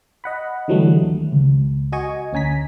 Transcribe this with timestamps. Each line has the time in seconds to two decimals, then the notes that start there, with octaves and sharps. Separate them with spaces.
0.24 D#5 F#5 B5
0.68 D3 E3 F#3 G3 A3
1.02 D#2
1.32 C#2
1.92 F#4 D#5 G#5 C#6
2.33 D2 C#4 G#5 A#5 B6